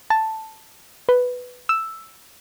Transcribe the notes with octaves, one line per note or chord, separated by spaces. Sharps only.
A5
B4
E6